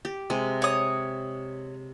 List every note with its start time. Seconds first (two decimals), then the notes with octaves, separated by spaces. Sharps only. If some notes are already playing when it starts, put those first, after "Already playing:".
0.05 G4
0.30 C3 G#3
0.62 C#5 D#6